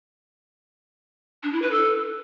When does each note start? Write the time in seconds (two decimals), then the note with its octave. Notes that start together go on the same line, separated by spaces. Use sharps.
1.43 D4
1.53 E4
1.62 B4
1.71 A4